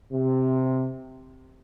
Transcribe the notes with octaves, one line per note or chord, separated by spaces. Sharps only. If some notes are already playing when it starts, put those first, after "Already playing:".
C3